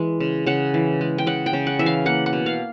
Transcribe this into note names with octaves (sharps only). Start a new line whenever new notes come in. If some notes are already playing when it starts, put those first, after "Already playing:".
Already playing: E3 G#3
C#3
C#3 F#5
E3
G#3
G5
C#3 F#5
G5
C#3
F#5
E3 E5
F5
A#3 F#5
F#5
B2
F5